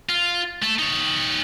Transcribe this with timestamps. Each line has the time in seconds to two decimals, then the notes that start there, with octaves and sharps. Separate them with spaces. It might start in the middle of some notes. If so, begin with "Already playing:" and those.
0.09 F4
0.62 A3 A4
0.79 D#4 C#5